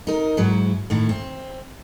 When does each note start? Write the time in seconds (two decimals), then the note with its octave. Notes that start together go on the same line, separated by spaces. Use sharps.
0.07 D#4 A#4
0.37 G#2 F#3 E4
0.90 A2 D#3 E4
1.09 C4